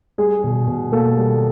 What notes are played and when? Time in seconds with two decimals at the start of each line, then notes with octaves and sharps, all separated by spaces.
0.18 G3 G#4
0.44 B2
0.68 B2
0.92 A#3 A4
1.17 G3